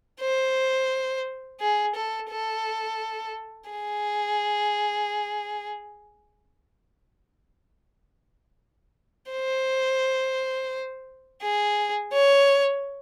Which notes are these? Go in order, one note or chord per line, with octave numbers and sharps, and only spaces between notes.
C5
G#4
A4
A4
G#4
C5
G#4
C#5